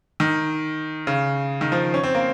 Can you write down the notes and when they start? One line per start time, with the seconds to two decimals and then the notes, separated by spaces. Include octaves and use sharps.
0.20 D#3
1.07 C#3
1.61 D#3
1.72 F3
1.94 C#4
2.03 C4
2.15 A#3